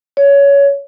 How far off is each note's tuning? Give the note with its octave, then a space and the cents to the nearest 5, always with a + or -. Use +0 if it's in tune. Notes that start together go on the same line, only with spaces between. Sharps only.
C#5 +20